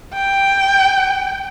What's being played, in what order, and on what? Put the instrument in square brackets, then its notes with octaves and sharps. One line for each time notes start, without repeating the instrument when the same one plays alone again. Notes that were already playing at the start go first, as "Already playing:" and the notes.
[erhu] G5